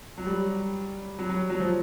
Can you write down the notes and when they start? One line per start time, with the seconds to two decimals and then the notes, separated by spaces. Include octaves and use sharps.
0.18 F#3
0.27 G3
1.19 F#3
1.30 F#3
1.50 F#3
1.60 F3